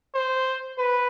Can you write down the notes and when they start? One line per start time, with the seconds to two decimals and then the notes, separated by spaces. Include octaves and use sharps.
0.14 C5
0.79 B4